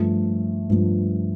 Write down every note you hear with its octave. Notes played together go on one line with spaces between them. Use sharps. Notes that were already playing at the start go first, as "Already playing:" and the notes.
Already playing: G2 F3 A3
G2 F3 A3